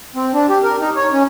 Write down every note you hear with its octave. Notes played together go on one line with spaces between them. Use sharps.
C4
D4
G4
A#4
D#4
C#5
C#4